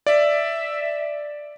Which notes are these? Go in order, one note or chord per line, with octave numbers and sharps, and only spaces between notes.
D5 E5